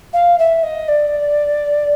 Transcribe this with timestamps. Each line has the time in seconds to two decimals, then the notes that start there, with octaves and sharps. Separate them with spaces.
0.13 F5
0.38 E5
0.63 D#5
0.88 D5